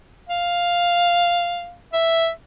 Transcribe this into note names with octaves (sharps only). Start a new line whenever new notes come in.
F5
E5